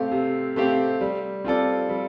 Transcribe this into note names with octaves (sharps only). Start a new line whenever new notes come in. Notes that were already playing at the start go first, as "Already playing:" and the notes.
Already playing: C3 A3 C4 G4 F5
C3
A3 C4 G4 F5
G3
C4 F4 A4 D5
G3